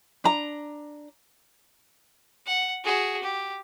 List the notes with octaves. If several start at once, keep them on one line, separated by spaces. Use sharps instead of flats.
D4 A#5
F#5
F#4 G#4
G4